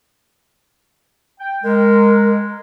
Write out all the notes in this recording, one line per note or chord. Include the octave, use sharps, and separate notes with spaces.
G5
G#3 A#4